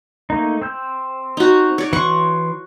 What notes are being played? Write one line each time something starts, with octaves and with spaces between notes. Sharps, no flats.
A3 A#3 D#4
C4 E6 G6
D#4 F#4
C#5 D5
E3 F#5 C6 C#6